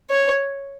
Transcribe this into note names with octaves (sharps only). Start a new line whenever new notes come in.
C#5